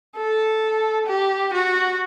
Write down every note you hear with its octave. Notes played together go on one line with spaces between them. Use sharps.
A4
G4
F#4